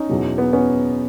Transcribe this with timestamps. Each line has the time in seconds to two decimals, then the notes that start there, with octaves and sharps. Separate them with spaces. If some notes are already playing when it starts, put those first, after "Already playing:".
Already playing: C#4 D#4
0.09 E2 B2 F#3
0.38 B3
0.53 B3 C#4